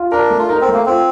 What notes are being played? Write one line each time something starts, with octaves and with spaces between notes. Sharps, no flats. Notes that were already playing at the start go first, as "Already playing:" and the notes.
Already playing: F4
D4 A#4
A3
F4
D#4 A#4
C4
A3
A#3
C4 F4